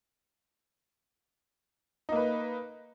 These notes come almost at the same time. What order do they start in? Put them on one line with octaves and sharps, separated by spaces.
D#4 A#3 B4